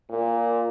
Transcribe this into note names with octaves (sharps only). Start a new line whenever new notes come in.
A#2